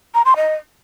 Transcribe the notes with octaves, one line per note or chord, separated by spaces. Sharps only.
A#5
C6
D#5